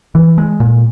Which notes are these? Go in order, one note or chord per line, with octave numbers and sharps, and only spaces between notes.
E3
G#3
A#2